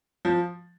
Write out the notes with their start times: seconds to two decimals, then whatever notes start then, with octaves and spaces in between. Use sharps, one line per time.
0.25 F3